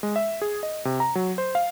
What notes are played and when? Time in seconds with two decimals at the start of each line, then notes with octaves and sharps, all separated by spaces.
0.03 G#3
0.16 E5
0.42 G#4
0.63 D#5
0.85 C3
1.00 A#5
1.15 F#3
1.38 C5
1.55 F5